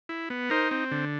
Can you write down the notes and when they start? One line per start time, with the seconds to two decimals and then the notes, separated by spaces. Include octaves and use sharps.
0.09 E4
0.30 B3
0.50 D#4 A#4 C5
0.71 C4
0.91 D3